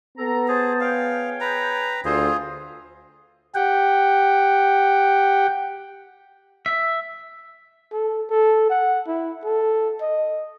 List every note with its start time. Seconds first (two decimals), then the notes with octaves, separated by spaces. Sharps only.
0.18 B3 A4 A#5
0.48 G#4 C5 A5
0.81 G#4 C#5 F5 G5
1.41 B4 A#5
2.05 D2 G2 F4 G#4 A4 C5
3.55 G4 F#5 G5
6.66 E5
7.92 A4
8.30 A4
8.70 F#5
9.07 E4
9.44 A4
10.01 D#5